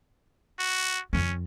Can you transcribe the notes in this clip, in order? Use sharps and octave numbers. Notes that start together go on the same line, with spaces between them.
F#4
F2 C4 C#4